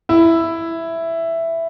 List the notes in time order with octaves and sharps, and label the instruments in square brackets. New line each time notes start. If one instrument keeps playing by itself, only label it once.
[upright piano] E4